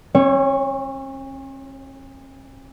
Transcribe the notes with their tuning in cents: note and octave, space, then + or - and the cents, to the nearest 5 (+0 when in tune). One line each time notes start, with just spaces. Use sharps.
C#4 -45 C#5 +0